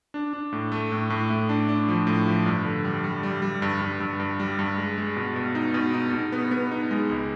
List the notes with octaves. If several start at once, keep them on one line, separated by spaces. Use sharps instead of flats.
D4
D4
A2
A3
A2
A2
A2
D4
D4
F3
A2
F3
G2
D3
G3
G3
G3
G3
G2
G2
G2
G2
G3
G2
G#3
G#3
B2
B2
D#4
B2
D#4
B2
B3
B3
D#4
G#3
C#2